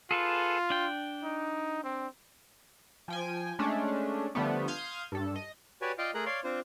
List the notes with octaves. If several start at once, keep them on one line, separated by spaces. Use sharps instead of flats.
F4 G#4 A4 B4
D4 G5
D#4
C4
F3 G5 G#5
G#3 A3 C#4 D4
D3 F3 G3 A3 B3
F5 C6 D#6 F6 G6 G#6
G2 A4
D#5
F#4 G4 B4 C#5 D5 G#5
F4 D5 D#5 F5 G5
A3 G#4 A#4 A#5 F#6
C#5 D5 F5 C6
C4 D4 F4 C5